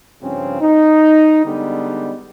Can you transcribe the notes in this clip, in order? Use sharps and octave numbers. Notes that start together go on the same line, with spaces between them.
G2 C#3 F3 C4 C#4
D#4
D3 G3 G#3 B3 D#4